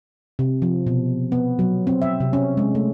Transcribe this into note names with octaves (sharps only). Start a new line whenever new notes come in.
C3
F3
B2
B3
F#3
C4
E5
C3
C#4
G#3
A3